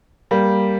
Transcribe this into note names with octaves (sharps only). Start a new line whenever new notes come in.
G3 A#3